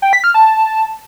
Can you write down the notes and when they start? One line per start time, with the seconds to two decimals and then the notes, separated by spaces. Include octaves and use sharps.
0.02 G5
0.13 B6
0.24 F6
0.34 A5